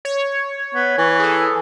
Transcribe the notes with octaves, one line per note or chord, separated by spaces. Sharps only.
C#5
B3
E3
G#4 A4